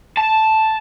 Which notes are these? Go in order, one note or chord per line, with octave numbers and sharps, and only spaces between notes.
A5